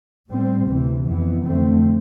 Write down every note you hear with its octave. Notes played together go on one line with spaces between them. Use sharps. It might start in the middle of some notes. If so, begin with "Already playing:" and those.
A2 G3 C4
D2 C3 E3
F2 E3 B3
F2 D3 A3 C4